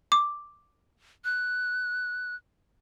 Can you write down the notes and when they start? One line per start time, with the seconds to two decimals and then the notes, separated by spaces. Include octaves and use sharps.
0.12 D6
1.25 F#6